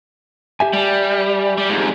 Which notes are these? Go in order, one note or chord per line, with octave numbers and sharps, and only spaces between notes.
G4 E5 G#5
G3
G3
F2 G#2